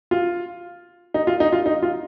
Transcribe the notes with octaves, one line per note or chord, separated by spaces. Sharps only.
F4
D#4
F4
D#4
F4
D#4
F4